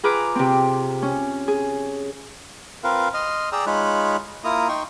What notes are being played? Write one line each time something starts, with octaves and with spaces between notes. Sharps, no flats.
F4 G#4 B4 A#5 D6
C3 C4
C#4
G#4
C4 F4 A#4 B4 F5
D#5 C6 F6
G#4 D5 G5 A#5 E6
G#3 D#4 F4 C#5 B5 F#6
A#3 E4 F4 A#5 D#6
D#4 G5 C6 C#6